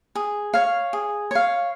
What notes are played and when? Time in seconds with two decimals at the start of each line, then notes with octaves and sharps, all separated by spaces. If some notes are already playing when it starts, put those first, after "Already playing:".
0.15 G#4
0.54 C#5 F5
0.93 G#4
1.31 C#5 F5